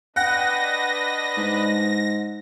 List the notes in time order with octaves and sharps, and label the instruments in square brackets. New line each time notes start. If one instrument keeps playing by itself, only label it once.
[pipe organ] D4 B4 D#5 [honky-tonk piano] F#5 G5 F#6 [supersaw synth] A#6
[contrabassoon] G#2